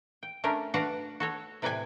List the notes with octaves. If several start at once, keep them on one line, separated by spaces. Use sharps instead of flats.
G5
A3 C#4 D4 A#4
D4 F#4 B4 F5 F#5
F#4 A4 C#5
A2 C3 B4 D5 G5 G#5